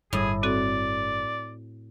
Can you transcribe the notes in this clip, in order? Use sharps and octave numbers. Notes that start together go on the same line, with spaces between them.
G1 A2 G3 G#4
C4 F#4 A4 D5